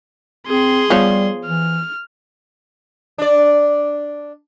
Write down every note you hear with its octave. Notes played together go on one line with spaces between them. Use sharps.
C4 G#4 C6
F3 G3 B3 C#5
E3 F6
D4 D5